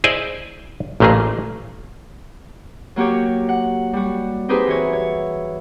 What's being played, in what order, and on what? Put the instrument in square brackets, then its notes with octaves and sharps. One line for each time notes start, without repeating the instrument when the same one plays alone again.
[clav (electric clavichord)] E4 G#4 C5 D5 D#5 G#5
A1 A#2 A3 A#3 G#4
[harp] F#3 A#3 F#4 G4 C#5
F#5
G3 F#4
C4 D#4 G4 G#4 B4 C5
E3 F#4 C#5
C#5